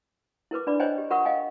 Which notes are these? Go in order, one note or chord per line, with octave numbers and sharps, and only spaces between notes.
E4 A#4 B4 D6
D4 B4 D5 B5 D6
C5 C#5 D#5 G5 G#5 A#5
G4
F4 A#4 F#5 B5 C#6 D#6
D#5 F5 G5 G#5